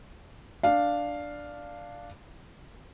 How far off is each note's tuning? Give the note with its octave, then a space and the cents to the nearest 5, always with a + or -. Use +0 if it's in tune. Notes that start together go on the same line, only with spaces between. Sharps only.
D4 +0 F5 +0